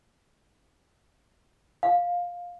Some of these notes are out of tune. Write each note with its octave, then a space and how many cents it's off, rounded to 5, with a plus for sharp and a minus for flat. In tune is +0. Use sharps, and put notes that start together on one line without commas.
F5 +10